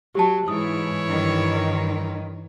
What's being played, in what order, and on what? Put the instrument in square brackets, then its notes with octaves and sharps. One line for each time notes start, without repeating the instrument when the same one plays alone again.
[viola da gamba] F#3 [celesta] G4 A5
[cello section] G#2 [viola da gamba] E3 E4 C#5 [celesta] D#6
[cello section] G2 D#3